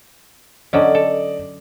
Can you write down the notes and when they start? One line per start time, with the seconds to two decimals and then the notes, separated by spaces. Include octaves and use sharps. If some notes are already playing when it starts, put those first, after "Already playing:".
0.73 D3 F#3 C#4 D5 D#5
0.95 A4